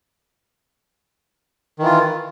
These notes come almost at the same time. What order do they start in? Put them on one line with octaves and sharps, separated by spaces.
D#3 E3 F4